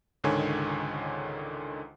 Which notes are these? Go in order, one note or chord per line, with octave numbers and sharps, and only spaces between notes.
C#2 G#2 D3 D#3 C#5 G#5